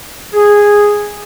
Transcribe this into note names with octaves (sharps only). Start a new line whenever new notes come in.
G#4